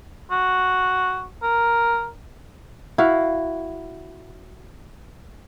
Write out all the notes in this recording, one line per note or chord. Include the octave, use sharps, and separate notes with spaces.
F#4
A#4
E4 F#4 F5